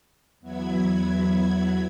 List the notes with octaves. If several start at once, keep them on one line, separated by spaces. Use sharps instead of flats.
E2 F#3 B3 E4 B5 G#6